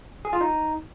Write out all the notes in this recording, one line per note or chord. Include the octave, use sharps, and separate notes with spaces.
G#4
F4
D#4